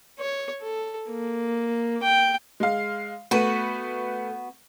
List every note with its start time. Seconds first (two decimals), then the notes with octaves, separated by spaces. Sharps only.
0.20 C#5
0.62 A4
1.10 A#3
2.03 G5
2.60 G#3 F5
3.31 A3 B3 F#4 B4 D#7